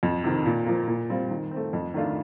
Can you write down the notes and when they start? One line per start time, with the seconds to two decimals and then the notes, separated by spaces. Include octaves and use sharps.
0.03 F2
0.24 C3 D#3
0.46 A#2
0.66 F3 A#3
0.88 A#2
1.10 G3 C4 F4
1.30 D#3
1.51 C4
1.57 A3
1.73 F2
1.94 D#3 A3 D4 F4